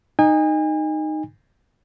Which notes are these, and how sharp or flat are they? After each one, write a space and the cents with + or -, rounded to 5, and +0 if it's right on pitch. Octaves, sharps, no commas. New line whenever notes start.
D#4 -10 G#5 -35